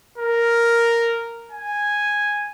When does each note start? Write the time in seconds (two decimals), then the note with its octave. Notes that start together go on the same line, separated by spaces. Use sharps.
0.18 A#4
1.52 G#5